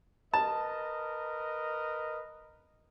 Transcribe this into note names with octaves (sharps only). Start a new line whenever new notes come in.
A#4 B4 D#5 A5